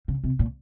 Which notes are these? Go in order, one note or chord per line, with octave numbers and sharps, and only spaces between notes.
C#3
C3
A#2